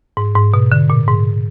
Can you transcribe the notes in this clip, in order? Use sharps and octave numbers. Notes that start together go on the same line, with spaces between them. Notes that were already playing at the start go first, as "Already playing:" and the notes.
G#2
G#2
B2
D3
A#2
G#2